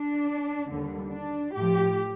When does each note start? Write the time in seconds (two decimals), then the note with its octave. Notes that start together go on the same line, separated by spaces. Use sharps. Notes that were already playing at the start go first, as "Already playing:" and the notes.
Already playing: D4
0.69 D#2 D3 G3
1.12 D4
1.54 A2 F3 G4